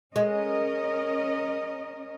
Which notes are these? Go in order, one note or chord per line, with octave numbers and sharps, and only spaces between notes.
G#3 C#4 A#4 D#5